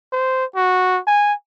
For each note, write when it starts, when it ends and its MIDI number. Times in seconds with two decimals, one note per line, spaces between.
0.12 0.45 72
0.56 1.00 66
1.07 1.34 80